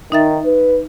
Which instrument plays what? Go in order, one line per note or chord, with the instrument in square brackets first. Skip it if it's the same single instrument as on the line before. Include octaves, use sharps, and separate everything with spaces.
[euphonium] D#3 [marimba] D#4 E5 A6
[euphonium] B4